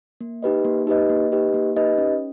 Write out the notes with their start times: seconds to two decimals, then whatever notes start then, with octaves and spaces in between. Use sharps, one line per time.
0.21 A#3
0.43 D#4 G4 B4 D#5
0.65 A#3
0.87 D#4 G4 B4 D#5
1.09 A#3
1.32 D#4 G4 B4 D#5
1.54 A#3
1.76 D#4 G4 B4 D#5
1.98 C#4